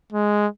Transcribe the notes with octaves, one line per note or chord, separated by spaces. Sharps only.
G#3